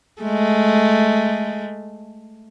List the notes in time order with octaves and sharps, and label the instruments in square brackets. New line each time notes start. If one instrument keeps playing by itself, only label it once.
[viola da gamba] G#3 A3